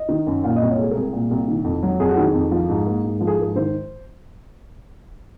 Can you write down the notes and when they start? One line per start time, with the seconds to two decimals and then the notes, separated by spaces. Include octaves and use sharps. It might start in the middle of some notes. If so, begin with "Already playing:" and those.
Already playing: D#5
0.09 D#3
0.27 F#2
0.44 A#2 F5
0.56 D#5
0.61 C2
0.69 C#5
0.78 G#3 G#4
0.91 A#4
0.95 C2 G#4
1.13 A#2
1.31 C2
1.48 D#3
1.64 F2
1.83 F#3
1.99 F2 G#4
2.09 F#4
2.17 D#3 G#4
2.34 F2
2.51 F3
2.69 G#2
2.87 A#3
3.04 G#2
3.20 F3
3.27 G#4
3.39 G#2 A#4
3.55 D#3 C5